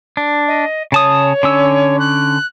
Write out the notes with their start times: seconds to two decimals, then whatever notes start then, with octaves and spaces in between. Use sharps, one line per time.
0.17 D4
0.48 D#5
0.92 C#3 C#5 A5 D#6
1.43 D3 C#4 E6
1.99 F#6